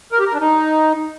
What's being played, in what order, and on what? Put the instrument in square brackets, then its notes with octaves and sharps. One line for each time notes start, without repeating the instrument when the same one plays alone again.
[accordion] A#4
G4
A#4
D4
D#4